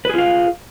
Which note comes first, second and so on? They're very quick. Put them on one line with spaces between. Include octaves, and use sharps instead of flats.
B4 G#4 F4 F5